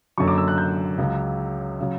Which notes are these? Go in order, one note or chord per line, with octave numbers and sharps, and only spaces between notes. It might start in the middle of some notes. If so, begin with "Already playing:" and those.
F#1 F#2 D3 F#3 C#6
D6
E6
F#6
G6
C#2 C#3 F#3
C#3 F#3